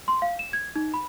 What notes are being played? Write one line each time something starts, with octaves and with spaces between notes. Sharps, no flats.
C6
F5
E7
G#6
D#4
B5